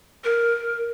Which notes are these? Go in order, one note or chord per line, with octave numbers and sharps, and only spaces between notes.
A#4